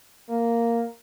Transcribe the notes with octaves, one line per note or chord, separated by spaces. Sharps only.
A#3